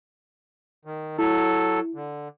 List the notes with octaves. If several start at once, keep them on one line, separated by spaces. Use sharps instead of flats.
D#3
F#3 E4 A4
D3